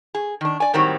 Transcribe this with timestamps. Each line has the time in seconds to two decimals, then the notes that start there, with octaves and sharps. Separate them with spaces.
0.15 G#4
0.41 D#3 D4
0.60 D5 G#5
0.74 A2 D#3 F#3 G3 C4